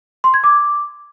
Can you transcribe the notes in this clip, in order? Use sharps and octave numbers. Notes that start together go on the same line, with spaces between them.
C6
G#6
D6